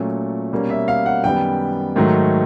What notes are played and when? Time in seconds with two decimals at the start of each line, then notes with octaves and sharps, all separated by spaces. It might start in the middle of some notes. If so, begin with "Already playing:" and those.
Already playing: A#2 F#3 A3 C#4
0.52 B2 G3 A#3 C#4
0.70 E5
0.88 F5
1.06 F#5
1.24 F#2 D#3 G3 B3 G5
1.96 G#2 D#3 F#3 A3